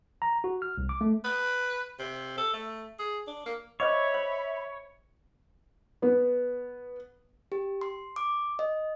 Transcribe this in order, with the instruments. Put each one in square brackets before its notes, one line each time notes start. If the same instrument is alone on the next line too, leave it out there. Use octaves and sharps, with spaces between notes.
[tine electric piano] A#5
F#4
F6
C2
D6
A3
[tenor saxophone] B4
C3
A4
A3
G#4
D4
A#3
[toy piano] C5 D#5 D6 [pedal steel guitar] C#5 [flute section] E5 B5
[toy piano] C5
[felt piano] B3
[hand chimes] G4
C6
D6
D#5